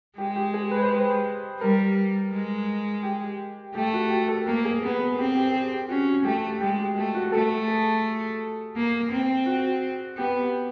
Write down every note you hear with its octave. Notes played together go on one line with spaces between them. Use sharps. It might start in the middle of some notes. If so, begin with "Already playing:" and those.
G#3 G4
G4
G#4
B4
C5
B4
G3 A#4
G#3
G4
A3 G4
F#4
G4
A4
A#3 A#4
G#4
B3
G#4
C4 G4
G4
G#4
G4
C#4 F#4
A3 G4
G#3 G4
G4
A3 G4
F#4
A3 A4
G#4
A#3
C4
F#4
B3 G4